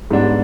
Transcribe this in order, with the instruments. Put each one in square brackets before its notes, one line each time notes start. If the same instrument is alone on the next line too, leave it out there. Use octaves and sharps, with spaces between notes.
[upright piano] G#2 G3 B3 D4